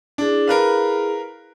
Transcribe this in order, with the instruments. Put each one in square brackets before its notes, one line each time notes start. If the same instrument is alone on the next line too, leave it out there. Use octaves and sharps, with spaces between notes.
[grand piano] D4 [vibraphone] E4 G#4
[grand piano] A#4 B4 F5